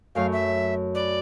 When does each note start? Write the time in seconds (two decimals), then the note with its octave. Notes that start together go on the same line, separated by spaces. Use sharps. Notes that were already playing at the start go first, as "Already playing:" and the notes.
0.15 F#2 A3 C#5 F5
0.32 E5
0.95 B4 D5